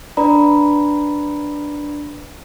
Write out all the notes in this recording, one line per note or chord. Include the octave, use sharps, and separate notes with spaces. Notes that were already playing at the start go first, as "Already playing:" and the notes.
D4 B4 D5 A#5 B5